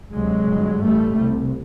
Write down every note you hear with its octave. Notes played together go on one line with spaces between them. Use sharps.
D2 C3 F#3 G#3
G1 G2
A1 G2 G3 A3
C2 C3